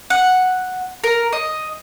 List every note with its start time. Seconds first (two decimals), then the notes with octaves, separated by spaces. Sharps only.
0.10 F#5
1.04 A#4
1.33 D#5